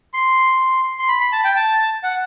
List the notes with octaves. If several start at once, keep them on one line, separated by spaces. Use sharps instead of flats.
C6
C6
B5
B5
A5
G5
A5
F#5